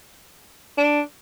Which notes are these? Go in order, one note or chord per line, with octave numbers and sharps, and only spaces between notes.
D4